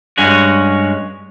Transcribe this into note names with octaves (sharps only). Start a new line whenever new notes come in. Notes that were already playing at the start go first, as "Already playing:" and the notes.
G2 G#3 C#4 F#4